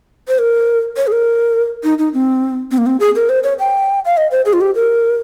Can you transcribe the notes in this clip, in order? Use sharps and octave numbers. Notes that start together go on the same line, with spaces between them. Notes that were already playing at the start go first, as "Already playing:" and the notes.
C5
A#4
C#5
G#4
A#4
D#4
D#4
C4
C4
A#3
C4
G#4
A#4
C5
C#5
G5
F5
D#5
C5
G#4
F4
G4
A#4